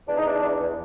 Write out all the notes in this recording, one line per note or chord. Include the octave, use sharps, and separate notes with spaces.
E2 D4
D#4
E2 D4
E2
E2